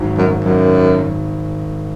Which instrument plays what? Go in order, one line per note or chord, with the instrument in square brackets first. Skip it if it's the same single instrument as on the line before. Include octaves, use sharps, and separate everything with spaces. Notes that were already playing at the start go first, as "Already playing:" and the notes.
Already playing: [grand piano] G#1 G#2 D#3 F#3
[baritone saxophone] F#2
F#2